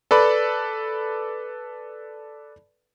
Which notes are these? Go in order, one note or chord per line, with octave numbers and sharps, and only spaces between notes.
A4 B4 D5 B5